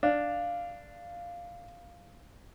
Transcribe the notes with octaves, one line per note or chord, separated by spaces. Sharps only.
D4 F5